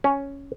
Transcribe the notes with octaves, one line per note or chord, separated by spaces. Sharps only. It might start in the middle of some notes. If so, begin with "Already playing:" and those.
C#4